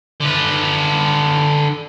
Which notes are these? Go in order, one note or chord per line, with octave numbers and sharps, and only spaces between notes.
D3 B4